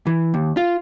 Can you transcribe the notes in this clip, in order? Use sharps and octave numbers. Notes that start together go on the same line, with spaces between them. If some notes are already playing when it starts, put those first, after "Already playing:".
E3
D#2
F4